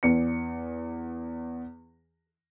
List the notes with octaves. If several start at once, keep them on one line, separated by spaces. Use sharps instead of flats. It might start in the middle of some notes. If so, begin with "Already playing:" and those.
E2 B3 C#7